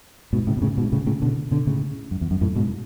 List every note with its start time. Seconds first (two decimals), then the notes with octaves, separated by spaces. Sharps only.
0.33 G#2 B2
0.47 A2 C#3
0.57 B2
0.62 A2 C#3
0.77 G#2 B2
0.92 A2 C#3
1.07 A2 C#3
1.22 B2 D3
1.51 B2 D3
1.67 A2 C#3
2.11 F#2
2.21 E2
2.31 F#2
2.41 F#2 A2
2.56 G#2 B2